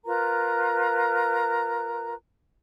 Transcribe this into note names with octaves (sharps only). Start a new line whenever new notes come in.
F4 A#4 B4 A#5